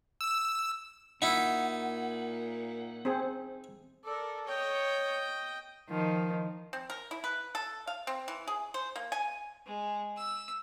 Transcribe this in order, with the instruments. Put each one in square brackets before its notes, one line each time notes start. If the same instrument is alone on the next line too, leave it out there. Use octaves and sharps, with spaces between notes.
[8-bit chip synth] E6
[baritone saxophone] A#2 [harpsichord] D#4 E4 [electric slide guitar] F#5
[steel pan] C4 G#4
[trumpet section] A4 [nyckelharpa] A#4 D5
[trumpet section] C#5 [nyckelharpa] D#5 G5
[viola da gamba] D#3 F3
[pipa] C4
A#4
E4
B4
A4
F5
C4
E3
G#4
C5
A#3
G#5
[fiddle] G#3
E6